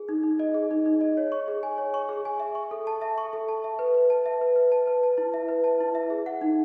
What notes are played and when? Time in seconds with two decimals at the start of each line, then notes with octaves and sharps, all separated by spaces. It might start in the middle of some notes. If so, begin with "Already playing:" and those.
Already playing: G#4
0.09 D#4
0.24 D#4
0.39 D#5
0.54 G#4
0.71 D#4
0.86 D#4
1.01 D#5
1.17 C#5
1.32 C#6
1.48 G#4
1.63 G#5
1.78 C#5
1.94 C#6
2.09 G#4
2.25 G#5
2.40 E5
2.55 C#6
2.71 A4
2.87 A5
3.02 E5
3.18 C#6
3.33 A4
3.48 A5
3.64 E5
3.79 B4
3.94 B4
4.10 A5
4.26 E5
4.41 B4
4.56 B4
4.72 A5
4.87 B4
5.03 A5
5.18 E4
5.34 E5
5.48 B4
5.64 A5
5.80 E4
5.95 E5
6.10 G#4
6.26 F#5
6.41 D#4